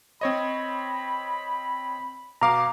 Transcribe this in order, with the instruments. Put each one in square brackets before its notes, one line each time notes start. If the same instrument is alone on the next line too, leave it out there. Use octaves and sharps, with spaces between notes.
[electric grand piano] C4 C#5 D#5 [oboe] B5
[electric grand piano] B2 F5 [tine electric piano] A#5 D6